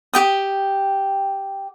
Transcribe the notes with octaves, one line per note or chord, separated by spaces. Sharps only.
G4 G5 D#6